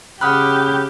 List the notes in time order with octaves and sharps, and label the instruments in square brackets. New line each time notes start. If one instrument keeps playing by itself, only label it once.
[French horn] C#3 [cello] G4 [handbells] F#5 B5 [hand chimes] D#6 F6 F#6